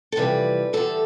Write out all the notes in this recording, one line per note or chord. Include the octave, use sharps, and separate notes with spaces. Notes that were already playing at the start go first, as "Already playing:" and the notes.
A4
F2 C3 E3 G3 B4
E2 D3 G3 A4